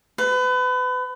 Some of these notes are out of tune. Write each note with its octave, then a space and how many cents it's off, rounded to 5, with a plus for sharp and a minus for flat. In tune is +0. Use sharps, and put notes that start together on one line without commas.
B4 +30